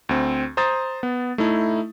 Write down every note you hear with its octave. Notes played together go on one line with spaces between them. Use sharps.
D2 C4
C5 A#5 D#6 A6
B3
A3 D#4 E4